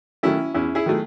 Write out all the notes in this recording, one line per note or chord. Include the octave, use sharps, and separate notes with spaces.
D#3 F#3 A3 C#4 E4
E2 C#4 E4
E4 G#4
D#3 F#3 A3